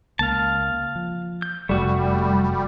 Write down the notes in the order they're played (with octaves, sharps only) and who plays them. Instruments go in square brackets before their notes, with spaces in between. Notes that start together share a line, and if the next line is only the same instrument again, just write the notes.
[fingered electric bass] C#2 A#3 [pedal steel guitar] F5 A5
[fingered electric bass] F3
[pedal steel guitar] G6
[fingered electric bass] F1 F#2 [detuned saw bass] G3 [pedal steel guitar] A3 F#4